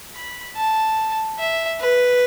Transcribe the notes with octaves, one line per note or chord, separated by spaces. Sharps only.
B5
A5
E5
B4